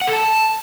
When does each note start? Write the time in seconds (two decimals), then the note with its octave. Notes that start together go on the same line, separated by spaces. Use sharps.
0.01 F#5
0.07 A4
0.13 A5